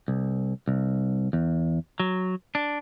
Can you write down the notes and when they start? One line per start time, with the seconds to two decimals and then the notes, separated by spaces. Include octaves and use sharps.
0.08 C2
0.68 C2
1.33 E2
2.00 F#3
2.55 D4